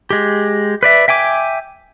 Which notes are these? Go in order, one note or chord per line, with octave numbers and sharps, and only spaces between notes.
G#3 G4
B4 D5 E5
E5 G5 G#5 D6